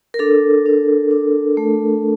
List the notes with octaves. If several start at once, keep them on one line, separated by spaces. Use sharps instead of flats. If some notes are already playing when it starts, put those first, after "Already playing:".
A#4
D4 A4
D4
D4
A3